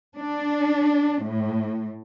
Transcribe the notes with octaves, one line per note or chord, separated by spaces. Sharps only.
D4
A2